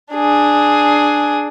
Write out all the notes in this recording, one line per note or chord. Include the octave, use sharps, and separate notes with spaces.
D4 G#4